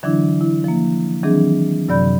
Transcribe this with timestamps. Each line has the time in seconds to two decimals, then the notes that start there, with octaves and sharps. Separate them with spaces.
0.03 D3 E3 F#3 D4 E4
0.41 E4
0.64 F3 A#3
1.23 D#3 E3 F#3 C4 D4 G#4
1.88 F#2 C3 F#3 D5 B5 G6